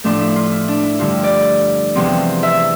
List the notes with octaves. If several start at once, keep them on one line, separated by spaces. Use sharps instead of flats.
A2 F3 A3 D4
E4
F4
E4
D4
E4
G2 D3 F3 F4
D5
E2 C3 F3 C4
E5